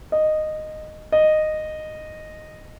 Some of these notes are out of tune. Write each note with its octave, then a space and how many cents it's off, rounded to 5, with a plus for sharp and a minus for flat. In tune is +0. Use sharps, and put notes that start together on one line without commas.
D#5 -10
D#5 -10